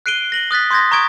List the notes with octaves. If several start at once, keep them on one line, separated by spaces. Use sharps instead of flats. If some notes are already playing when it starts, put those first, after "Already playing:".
F#6 C7 D7 D#7 G7
A#6 F#7 G7
D#6 F#6 A6 B6
C6 D#6 G6 G#6 A#6
A#5 C#6 D#6 G#6 D7